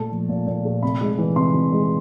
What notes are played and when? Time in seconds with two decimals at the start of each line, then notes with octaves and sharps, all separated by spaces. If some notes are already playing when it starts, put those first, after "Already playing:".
Already playing: A#2 A3 A5
0.12 F3
0.29 A#2
0.47 A#2
0.65 A3
0.82 C3 B5
1.01 G#3
1.18 E3
1.36 C3 C6
1.54 C3
1.72 G#3